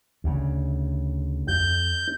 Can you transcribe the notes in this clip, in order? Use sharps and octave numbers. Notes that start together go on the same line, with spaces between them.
D2 C#3
F2 G6